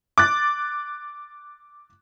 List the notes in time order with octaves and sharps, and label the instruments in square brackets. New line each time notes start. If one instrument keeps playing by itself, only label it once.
[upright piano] D6 F#6 A6